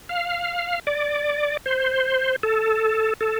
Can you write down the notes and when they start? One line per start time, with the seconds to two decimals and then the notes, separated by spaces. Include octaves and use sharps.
0.09 F5
0.87 D5
1.66 C5
2.43 A4
3.21 A4